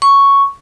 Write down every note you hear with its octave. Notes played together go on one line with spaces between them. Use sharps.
C#6